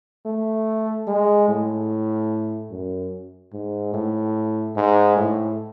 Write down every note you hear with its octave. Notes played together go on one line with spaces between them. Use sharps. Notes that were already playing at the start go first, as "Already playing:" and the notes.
A3
G#3
A2
F#2
G#2
A2
G#2
A2